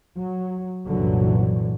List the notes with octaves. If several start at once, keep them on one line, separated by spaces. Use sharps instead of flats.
F#3
C2 F#2 A#2 D3 E3 F#3